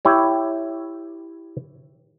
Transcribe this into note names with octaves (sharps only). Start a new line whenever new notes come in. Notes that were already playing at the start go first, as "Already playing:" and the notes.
E4 G4 C#5